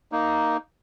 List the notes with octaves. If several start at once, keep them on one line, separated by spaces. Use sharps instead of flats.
A#3 D#4